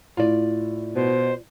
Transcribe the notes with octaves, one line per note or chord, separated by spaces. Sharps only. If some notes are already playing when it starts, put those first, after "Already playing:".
A2 F4 D5
B2 C5